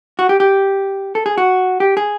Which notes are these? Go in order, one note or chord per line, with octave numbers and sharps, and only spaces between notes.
F#4
G4
G4
A4
G#4
F#4
G4
G#4